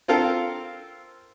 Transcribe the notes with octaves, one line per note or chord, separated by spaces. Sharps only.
C4 F4 A4 A#4 F5 G5